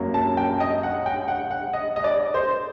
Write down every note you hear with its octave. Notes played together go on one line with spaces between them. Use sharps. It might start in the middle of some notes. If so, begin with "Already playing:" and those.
Already playing: F#2 F#3 A#3
A5
G5
D#5
F#5
G5
F#5
F#5
D#5
D#5
D5
C5